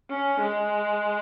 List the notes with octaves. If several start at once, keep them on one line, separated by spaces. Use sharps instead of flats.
C#4
G#3